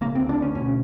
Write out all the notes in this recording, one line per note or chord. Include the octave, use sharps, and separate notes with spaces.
C#3 A#3
C4
D2
D4
D2
C#4
B2 C#4